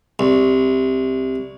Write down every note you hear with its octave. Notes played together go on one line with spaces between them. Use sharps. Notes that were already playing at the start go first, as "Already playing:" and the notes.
C2